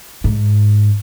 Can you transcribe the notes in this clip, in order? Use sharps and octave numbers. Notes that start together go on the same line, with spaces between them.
G#2